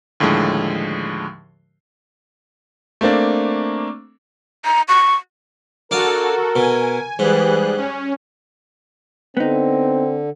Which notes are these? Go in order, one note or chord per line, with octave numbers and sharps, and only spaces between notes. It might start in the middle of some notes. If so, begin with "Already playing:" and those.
D#2 A2 D3 F3 G#3
A3 A#3 C4 D4
A#5
C#6
D4 F#4 A4 A#4 F5 G#5
B2 G#5
G#2 E3 G3 G#4 F#6
C#4
D3 B3 C4 D#4